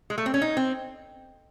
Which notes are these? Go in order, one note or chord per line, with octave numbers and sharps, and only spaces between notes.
G#3
A3
C4
C#4
D#4
C4